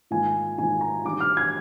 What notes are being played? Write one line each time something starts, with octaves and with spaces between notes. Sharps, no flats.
G#2 D#3 A#3 F4 G#5
G#2 D#3 A#3 F4 G#5
A#5
D#3 G3 D4 D6
F6
G#6